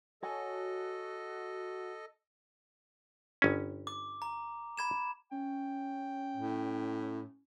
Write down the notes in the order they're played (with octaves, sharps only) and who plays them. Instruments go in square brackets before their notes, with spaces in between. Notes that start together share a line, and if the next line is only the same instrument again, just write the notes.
[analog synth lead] F#4 [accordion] A4 D#5 [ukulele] C#5 G#5 A5
[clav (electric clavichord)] G1 C#4
[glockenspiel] D6
A#5
B5 G#6 E7
[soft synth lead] C#4 [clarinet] G5
[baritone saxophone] A2